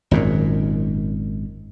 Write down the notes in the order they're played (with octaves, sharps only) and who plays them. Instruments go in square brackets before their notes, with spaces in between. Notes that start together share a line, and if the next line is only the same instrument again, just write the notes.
[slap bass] G#1 F#2 A#2